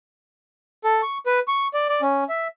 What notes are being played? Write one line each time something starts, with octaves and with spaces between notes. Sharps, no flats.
A4
C#6
B4
C#6
D5
D5
C#4
E5